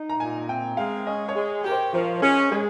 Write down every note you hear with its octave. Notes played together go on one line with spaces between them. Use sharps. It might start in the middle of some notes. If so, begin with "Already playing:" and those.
Already playing: D#4
A#5
A#2 G#5
C4 G5
G#3 F5
C#4 D#5
C#5
G#3
G4 A#4
C5
F3 A#4
C#4 G#4
G#3 G#4